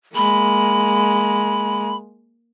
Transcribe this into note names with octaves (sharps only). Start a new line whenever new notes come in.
G#3 A#3 B5